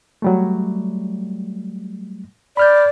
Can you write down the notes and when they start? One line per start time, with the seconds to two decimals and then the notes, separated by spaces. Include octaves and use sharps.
0.22 F#3 G3 A3
2.57 D5 B5 F6 G6